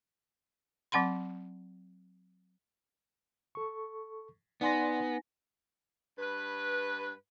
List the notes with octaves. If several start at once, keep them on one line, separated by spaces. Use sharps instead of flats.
F#3 C4 F#5 B5 C6
A4 C#6
B3 D#4 D5 F#5 G#5 C6 A#6
G2 B4